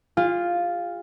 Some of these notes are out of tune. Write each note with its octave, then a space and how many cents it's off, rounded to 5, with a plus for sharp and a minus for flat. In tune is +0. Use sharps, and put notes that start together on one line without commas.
F4 +0 G#4 -45